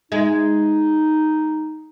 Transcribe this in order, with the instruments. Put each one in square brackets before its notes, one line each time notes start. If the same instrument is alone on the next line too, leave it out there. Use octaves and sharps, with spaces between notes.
[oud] G#3 [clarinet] D#4